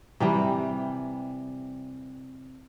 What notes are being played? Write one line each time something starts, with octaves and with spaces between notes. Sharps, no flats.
C3 E3 G3